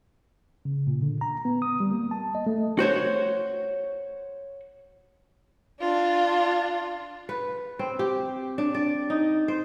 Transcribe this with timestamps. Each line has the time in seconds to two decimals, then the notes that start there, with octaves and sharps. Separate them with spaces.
0.65 C#3
0.87 A#2
1.02 D3
1.21 A#5
1.45 B3
1.62 D#6
1.80 G3
1.91 A#3
2.11 A5
2.35 D#5
2.47 A3
2.79 F#4 C5 C#5
5.81 D4 F4
7.29 B4
7.79 C4
7.99 G4
8.58 D4
8.75 D5
9.10 D#4
9.48 C5